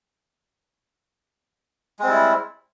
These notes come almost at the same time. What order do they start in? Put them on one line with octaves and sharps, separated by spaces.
G#3 C4 G3 E4